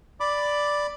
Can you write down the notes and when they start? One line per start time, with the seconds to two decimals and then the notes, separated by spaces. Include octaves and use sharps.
0.20 D5 B5 D6